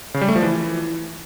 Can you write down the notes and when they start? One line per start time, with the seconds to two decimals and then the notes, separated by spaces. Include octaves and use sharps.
0.14 C#3
0.21 G3
0.28 A3
0.36 F3
0.43 E3